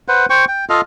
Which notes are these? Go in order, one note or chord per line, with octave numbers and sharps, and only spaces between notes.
B4 C5 F#5
C5 G5 C#6
G5
F4 A4 D#5 F5